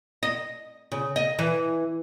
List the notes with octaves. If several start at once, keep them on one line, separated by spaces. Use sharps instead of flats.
D#5
C#3
D#5
E3